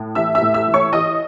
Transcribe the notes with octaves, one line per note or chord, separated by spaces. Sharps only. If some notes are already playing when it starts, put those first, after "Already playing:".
Already playing: A2
E3 E5 E6
E5 E6
A2
E5 E6
E3
C#5 C#6
E3 D#5 D#6